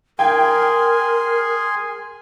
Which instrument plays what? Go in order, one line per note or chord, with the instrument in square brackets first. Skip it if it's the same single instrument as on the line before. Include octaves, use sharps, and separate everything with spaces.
[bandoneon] G#4 G#5 C6 [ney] A#4 [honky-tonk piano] G5 G#6